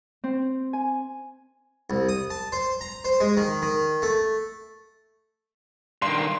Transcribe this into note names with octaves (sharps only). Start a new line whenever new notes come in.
C4
G#5
C2
D#6
A5
C5
A#5
C5
G#3
D#3
D#3
A3
G2 D#3 C6